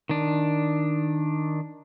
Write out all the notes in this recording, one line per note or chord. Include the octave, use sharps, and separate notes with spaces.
D#3 D4